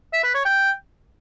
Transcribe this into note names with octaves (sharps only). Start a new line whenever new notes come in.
E5
B4
C#5
G5